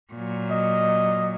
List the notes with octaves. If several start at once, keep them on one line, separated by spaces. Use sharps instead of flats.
A#2 F#3
D#5